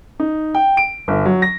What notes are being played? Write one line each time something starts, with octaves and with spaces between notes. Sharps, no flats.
D#4
G5
D7
G1
F#3
A#6